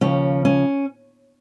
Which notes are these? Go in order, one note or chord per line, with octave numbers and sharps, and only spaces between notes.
D#2 C#3 F3 C#4
C#4